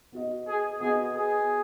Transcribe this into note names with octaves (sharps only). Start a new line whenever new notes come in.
B3 F#4 D#5
G#4
B3 F#4 G#4 D#5
G#4